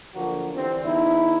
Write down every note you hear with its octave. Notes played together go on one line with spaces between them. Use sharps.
D3 F3 F#3 A#3 F#4
D3 E3 G3 C4
E2 D#4 E4